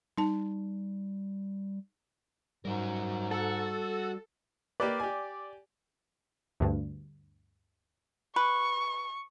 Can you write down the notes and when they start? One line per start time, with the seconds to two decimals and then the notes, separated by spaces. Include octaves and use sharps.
0.18 G3 D#4 A5
2.65 G#2 F#3 G3 A#4
3.31 F#4 A4
4.80 A#3 G4 B4 D5
5.00 G4 G#5
6.60 D2 G2
8.36 B4 C#6